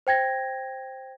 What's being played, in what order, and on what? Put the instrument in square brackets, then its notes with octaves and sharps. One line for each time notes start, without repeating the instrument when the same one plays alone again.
[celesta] C5 G5 G#6 A#6